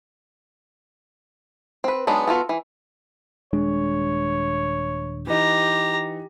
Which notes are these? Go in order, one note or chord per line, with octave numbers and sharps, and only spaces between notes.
C4 B4
F#3 G#3 B3 D4 D#4
B3 F4 F#4 A4
E3
D#1 G#3 D4 C#5
E3 D#4 G4 A#5